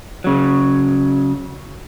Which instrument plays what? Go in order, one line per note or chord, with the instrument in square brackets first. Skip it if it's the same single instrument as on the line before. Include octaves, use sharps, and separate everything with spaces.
[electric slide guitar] C#3 F#3